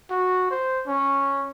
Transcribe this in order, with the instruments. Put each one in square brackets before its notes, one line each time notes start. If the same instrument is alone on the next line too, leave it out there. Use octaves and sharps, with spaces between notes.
[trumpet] F#4
C5
C#4